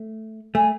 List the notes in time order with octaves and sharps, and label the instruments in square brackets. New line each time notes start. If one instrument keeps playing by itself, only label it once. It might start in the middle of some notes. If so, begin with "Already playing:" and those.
Already playing: [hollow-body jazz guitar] A3
[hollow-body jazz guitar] A3 [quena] G#5